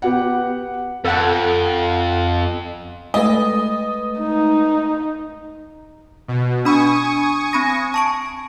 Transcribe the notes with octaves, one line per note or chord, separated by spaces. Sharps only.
B3 G4 F#5
F2 A4 F#5
G#3 A3 B4 D#5
D#4
B2
D4 G#5 B5 C#6 D#6
C4 B5 A#6
A5 C#6 D7